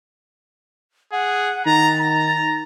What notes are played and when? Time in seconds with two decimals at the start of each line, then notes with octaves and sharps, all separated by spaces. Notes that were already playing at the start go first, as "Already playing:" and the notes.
1.12 G#4 F#5
1.66 D#3 A#5 A6
2.00 A#5